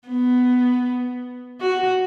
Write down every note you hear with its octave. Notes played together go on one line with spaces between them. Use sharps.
B3
F#4